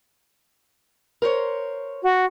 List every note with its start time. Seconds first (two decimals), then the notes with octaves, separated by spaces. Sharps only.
1.22 A#4 C5 C#5
2.03 F#4